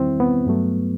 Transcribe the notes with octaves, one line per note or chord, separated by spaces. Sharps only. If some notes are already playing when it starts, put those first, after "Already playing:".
Already playing: E2 D#3 G3 C4 E4
B3
G2 F#3 A3